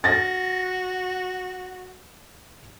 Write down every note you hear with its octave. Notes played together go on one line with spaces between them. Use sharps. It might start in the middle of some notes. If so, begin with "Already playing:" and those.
F#4 A6 A#6